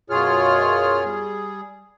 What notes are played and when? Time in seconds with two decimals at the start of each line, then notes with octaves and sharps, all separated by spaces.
0.10 F#2 B2 F4 G#4 C#5 F6
1.04 G3 G#4